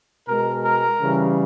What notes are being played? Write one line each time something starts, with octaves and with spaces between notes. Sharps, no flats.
B2 G#3 A#4
A#4
C#3 E3 G3